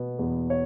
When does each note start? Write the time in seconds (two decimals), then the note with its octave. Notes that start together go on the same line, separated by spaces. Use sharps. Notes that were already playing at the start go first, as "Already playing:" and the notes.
Already playing: B2 B3
0.19 E2
0.50 C#5